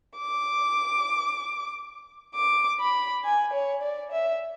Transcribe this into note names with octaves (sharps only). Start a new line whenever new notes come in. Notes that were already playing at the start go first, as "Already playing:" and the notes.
D6
D6
B5
G#5
C#5
D5
E5